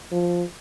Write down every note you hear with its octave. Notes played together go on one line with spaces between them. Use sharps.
F3